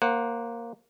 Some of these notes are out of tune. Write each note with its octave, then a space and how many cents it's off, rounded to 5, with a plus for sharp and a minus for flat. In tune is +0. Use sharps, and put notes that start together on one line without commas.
A#3 +0 C5 +30 F#5 +0